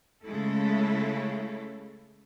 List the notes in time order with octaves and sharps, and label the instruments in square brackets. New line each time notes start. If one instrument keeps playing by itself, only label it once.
[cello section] C#3 G#3 A3 E4 A4